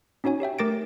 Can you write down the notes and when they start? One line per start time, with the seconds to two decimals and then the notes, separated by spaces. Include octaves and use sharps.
0.24 C#4 D#4 F#4 C#5 G#5
0.40 G4 C#5 E5 G5
0.59 A3 A#4 D6 A6 A#6 D7